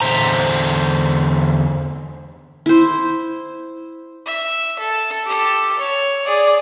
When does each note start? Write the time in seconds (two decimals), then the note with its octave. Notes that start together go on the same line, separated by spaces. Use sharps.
0.01 E2 D3 C5 A#5
2.66 E4 C5
4.26 E5
4.79 A4
5.26 G4 A4
5.79 C#5
6.25 G#4 D5